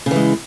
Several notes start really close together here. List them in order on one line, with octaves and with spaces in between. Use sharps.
C#3 E3 G#3